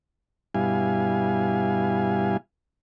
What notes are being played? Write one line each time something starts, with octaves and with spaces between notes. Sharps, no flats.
G2 B2 G3 E4 F5 G#5